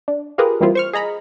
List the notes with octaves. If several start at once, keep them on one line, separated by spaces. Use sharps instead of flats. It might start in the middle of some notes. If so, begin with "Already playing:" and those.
D4
F4 G4 G#4 A#4 B4
E3 G3 A#3 C4 E4 F4
C5 C#6 F6
G#4 D#5 A#5 B5